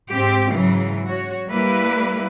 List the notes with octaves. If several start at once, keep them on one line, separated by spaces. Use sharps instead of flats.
G#2 C4 G4
G#2 C#3 E3 F#3
F#4 C#5
G3 A#3 E4 B4